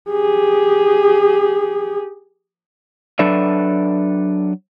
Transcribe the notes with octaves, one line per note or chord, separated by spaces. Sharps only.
G4 G#4
F#3 D4 A4 B4 D5 E5